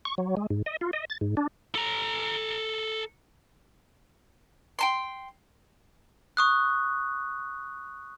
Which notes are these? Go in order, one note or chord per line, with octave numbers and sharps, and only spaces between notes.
C#6
F#3
G#3
G#2
D#5
F4
D#5
A6
G#2
D4
A4 A#5
G5 A5 C6
C#6 D#6 F#6